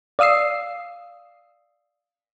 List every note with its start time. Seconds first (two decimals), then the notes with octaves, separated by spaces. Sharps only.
0.19 D5 F5 D#6 E6 C7